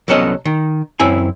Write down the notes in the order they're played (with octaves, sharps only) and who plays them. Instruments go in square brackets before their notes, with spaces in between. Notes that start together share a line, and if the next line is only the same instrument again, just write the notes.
[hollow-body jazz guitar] C2 F#3 B3 C#4 A4 D#5
D#3
F#2 C4 E4 G#5